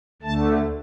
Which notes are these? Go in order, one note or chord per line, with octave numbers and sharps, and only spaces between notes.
D2 D3 A3 A5